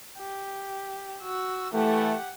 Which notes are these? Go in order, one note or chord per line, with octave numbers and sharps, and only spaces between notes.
G4
F#4 E6
E3 A3 G4 F#5